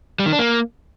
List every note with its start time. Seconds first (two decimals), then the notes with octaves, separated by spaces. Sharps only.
0.19 G3
0.26 D#3
0.32 D4
0.39 A#3